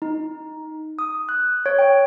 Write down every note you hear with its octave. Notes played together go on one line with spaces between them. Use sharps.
D#4
D#6
F#6
C#5
G5